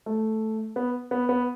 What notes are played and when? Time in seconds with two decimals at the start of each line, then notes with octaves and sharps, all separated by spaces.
0.06 A3
0.76 B3
1.11 B3
1.29 B3